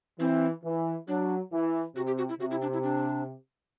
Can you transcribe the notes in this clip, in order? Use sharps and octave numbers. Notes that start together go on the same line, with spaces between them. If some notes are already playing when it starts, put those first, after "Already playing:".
E3 C4
E3
F#3 D4
E3
C3 F#4
G4
F#4
E4
C3 F#4
E4
D4
E4
D4